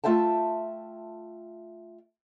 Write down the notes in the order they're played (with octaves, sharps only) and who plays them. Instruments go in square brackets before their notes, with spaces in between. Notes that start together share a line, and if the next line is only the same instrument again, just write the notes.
[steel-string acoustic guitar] A3 F4 E5 G5 A5